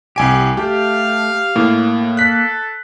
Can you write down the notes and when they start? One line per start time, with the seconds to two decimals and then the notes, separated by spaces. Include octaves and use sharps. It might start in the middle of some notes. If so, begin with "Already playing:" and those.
0.16 C2 G4 G#5 D7
0.57 A3 G4 F5
1.56 A2 A#3
2.17 A4 F#6 B6